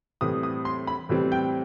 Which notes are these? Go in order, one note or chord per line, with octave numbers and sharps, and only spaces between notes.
A2 E3 G3 C4 D#6
D#6
C6
B5
A2 E3 G3 C4
G5